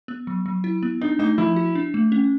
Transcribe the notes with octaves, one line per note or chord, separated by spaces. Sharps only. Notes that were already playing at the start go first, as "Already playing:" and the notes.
B3
F#3
F#3
E4
B3
D4 D#4
A3 D#4
F3 E4
F#4
D4
A3
C#4